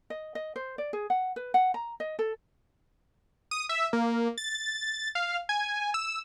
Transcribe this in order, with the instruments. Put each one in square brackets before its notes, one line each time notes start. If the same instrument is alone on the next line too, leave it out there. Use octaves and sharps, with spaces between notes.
[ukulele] D#5
D#5
C5
D5
G#4
F#5
B4
F#5
A#5
D#5
A4
[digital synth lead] D#6
E5
A#3
A6
F5
G#5
E6